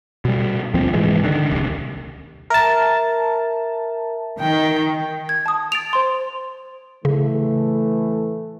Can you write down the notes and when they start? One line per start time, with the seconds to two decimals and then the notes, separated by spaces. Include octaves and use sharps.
0.25 B2 G3
0.74 D2 A#2 F3 C4
0.93 C2 G#2 E3 G#3
1.24 D3 D#3
1.50 D#1 C2
2.50 A#4 E5 A5
4.40 D#3 G5
5.29 G#6
5.46 A5 D#6
5.72 A6 D7 F7
5.93 C5 C6
7.05 A2 C#3 E3 A3